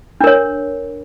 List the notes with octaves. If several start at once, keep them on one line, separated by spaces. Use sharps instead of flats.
D4 A#4 C#5